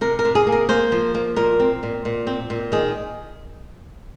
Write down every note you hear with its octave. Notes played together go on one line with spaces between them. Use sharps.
C3 A#4
A#4
C3
G#4
A#3
A#4
A#3 C5
F3
A#3
A#2 A#4
C4
A#2
A#2
C4
A#2
D#3 G#4